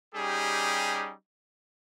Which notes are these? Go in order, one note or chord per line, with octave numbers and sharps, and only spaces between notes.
G3 C#4 D#4 G4 G#4